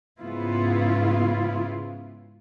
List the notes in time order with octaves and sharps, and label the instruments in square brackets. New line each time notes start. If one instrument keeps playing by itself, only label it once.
[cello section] G#2 C#3 B3 E4 F4